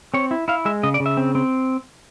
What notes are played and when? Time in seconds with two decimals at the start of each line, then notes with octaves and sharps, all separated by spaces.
0.14 C4 C#5
0.31 E4
0.48 E4 F5
0.65 G#3 E5
0.83 C#3 D#5
0.94 D5
1.00 C#3
1.06 E5
1.17 C4
1.35 C4